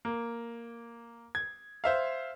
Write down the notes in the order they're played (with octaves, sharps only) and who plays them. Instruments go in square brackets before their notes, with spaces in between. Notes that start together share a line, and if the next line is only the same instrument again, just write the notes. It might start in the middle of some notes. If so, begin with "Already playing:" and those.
[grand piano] A#3
G#6
C5 E5 F5